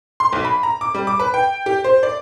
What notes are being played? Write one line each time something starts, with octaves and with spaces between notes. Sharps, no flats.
C6
B1
B5
A#5
D6
G3
D6
B4
G5
G4
C5
D5